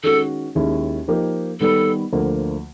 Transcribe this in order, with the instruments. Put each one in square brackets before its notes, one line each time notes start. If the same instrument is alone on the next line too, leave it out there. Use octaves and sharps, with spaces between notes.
[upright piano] D#3 G#3 C#4 F#4 [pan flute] A4
[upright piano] D#2 D#3 G#3 C#4 E4
F3 A#3 D#4 G4
[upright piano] D#3 G3 B3 [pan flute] A4
[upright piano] D2 D3 F3 A#3